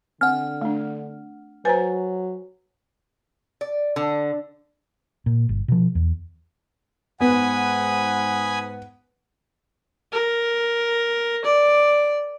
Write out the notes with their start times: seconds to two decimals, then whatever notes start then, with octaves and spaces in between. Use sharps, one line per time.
0.21 D3 C4 F#5 F6
0.62 A3 D4
1.65 F#3 B4 C5 G#5 A#5 A6
3.61 D5
3.96 D3
5.26 A#2
5.49 G1
5.68 B2 F3
5.95 E2
7.21 G#2 B3 F#5 G#5 B5 D#6
10.12 A#4
11.45 D5